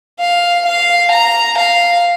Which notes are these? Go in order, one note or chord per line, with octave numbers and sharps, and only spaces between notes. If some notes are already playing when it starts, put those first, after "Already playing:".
F5
F5
A#5
F5